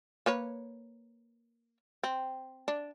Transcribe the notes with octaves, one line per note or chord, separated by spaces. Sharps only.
A#3 B4 C#5
C4
D4